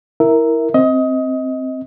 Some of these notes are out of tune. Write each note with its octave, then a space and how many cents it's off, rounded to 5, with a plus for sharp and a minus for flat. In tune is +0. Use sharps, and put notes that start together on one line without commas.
E4 -10 A#4 +0 E5 +0
C4 +0 D#5 +20